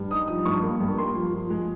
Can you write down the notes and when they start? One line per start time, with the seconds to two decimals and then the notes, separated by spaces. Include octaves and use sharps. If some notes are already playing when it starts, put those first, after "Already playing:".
Already playing: G2
0.10 D#4 D#6
0.28 F3 D#6
0.45 G2 C#6
0.63 A#3
0.80 G2
0.98 A#3 C6
1.15 F3
1.33 F3
1.50 G#3